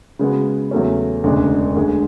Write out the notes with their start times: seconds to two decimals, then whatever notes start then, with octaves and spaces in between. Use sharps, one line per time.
0.19 C#3 G#3 B3 F#4
0.71 E2 C#3 F#3 A3 C#4
1.24 E1 D2 C#3 G#3 D4
1.76 D2 D3 G#3